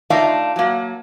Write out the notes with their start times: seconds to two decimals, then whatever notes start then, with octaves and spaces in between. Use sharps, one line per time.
0.10 A3 D4 D#4 F4 E5 F5
0.56 F#3 A#3